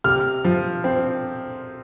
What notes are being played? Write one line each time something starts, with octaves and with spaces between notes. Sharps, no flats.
C3 F6
F3
C4